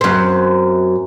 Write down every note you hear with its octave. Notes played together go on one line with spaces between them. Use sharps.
F#2 C4